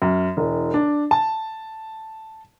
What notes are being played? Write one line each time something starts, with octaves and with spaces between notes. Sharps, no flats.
F#2
E1
D4
A5